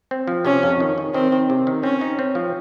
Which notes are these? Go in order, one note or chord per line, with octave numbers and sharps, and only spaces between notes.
C4
F3
C3 C#4
F2
D#3
D#3
D#3 C4
D#3
C3
D#3
C4 C#4
D#4
C4
F3